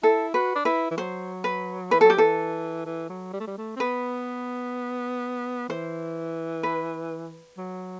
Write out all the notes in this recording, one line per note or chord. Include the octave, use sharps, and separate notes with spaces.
E4 A4
F#4 B4
D4
E4 B4
E3
F#3 C5
B4
E3 B4
F#3 A4
G4
E3 A4
E3
F#3
G3
A3
G3
A3
C4
B3 B4
E3 C5
B4
F#3